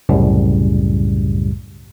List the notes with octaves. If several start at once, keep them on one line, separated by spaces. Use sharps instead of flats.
C2 F#2 A2 C#3 G3